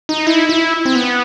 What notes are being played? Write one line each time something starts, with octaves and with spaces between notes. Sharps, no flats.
D#4
E4
E4
C4
B3